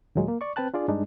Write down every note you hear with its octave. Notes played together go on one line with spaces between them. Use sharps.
D#2 A#2 F#3 G#3
A#3
D5 C#6
C4 B4 G5 A5 F#6
D4 F4 G#4 D5
G2 G#3 D4 D#4